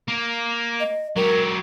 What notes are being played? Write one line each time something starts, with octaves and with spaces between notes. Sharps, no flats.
A#3
D#5
F#3 G4 A#4